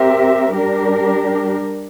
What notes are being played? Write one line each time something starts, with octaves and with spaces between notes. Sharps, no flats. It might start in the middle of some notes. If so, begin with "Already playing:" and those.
Already playing: C4 G4 A#4 E5
G3 D4 G4 A#4